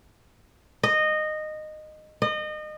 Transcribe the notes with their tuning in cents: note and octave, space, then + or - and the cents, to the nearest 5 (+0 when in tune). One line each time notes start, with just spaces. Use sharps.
D#5 -15
D#5 -30